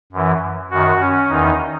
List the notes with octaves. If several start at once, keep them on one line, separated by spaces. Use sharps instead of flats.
F#2 E3
F#2 D#3 F#4
C#4
E2 D#3 D#4